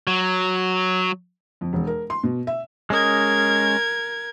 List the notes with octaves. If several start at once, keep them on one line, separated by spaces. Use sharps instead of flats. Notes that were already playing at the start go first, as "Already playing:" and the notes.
F#3
F2
E1
A#4
C6
B2
E5
G#3 C#4 A#4 D#5 G#6